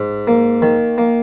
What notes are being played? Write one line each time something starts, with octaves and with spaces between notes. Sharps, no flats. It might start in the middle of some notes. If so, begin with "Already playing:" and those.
Already playing: G#2
A#3
D#3
A#3